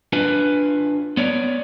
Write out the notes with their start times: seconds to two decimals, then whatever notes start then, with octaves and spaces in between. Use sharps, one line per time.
0.13 D4 F4 B4 G#5
1.17 B3 C#5 D5